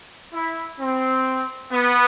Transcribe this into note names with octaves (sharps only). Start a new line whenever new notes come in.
E4
C4
B3